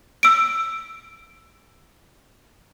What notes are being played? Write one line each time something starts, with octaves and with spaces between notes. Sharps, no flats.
E6 D7